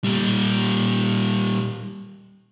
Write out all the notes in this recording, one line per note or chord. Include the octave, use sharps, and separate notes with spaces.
A#2 G3